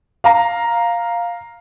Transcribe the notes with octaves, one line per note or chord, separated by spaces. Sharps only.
F5 A#5